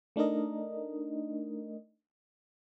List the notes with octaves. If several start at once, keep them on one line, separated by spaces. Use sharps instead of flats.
A3 D4 D#4 A#4 D#5